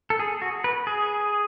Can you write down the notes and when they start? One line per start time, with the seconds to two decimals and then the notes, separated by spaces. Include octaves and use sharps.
0.10 A4
0.19 G#4
0.42 F#4
0.64 B4
0.87 G#4